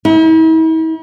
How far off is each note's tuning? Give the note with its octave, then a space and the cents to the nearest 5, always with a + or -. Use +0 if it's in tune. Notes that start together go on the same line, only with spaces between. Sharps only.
E4 -45